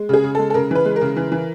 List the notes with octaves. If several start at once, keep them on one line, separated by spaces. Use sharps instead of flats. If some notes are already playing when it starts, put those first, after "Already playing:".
Already playing: G#3
C#3 G#4
C#3
G#3 A4
A4
C#3 A#4
E3 B4
G#3
A#4
C#3
E3
E3